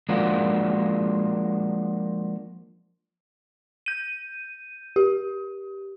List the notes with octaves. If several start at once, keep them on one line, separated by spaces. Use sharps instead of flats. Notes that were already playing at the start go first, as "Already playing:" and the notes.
F3 G#3 A#3 D4 F#4
G6 D#7
G4